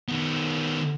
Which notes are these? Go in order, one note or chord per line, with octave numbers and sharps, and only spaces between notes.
D#3 B3